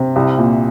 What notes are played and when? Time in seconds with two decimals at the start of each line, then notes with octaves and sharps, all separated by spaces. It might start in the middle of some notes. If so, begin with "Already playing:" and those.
Already playing: C3
0.16 C2
0.38 A#2